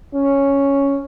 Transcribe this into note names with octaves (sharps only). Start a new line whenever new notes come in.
C#4